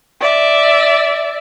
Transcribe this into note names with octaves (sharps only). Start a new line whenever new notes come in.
D5 E5